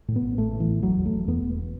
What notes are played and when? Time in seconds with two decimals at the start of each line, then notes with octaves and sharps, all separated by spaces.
0.08 A2
0.16 B3
0.22 A1
0.38 A2 A3
0.53 A2
0.60 E3
0.67 A1
0.83 E1 F#3
0.98 E2
1.06 A3
1.13 E1
1.28 E2 B3
1.43 E1